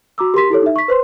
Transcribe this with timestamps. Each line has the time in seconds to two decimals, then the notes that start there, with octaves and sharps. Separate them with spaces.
0.18 F#4 A#5 D6 E6
0.34 G4 A#4 C6 B6
0.50 E4 G4 A4 C#5
0.62 D#4 E5
0.76 C#6 B6
0.88 B4 C5 C6